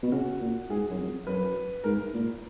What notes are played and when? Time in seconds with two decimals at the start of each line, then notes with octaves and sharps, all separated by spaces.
0.02 B2
0.12 C#3 F#4
0.41 A#2
0.70 G#2 G#4
0.90 F#2
0.98 F2
1.27 F#2 B4
1.84 G#2 A#4
2.14 A#2